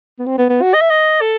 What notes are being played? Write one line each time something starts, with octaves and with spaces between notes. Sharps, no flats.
B3
C4
B3
B3
F#4
D#5
E5
D#5
A4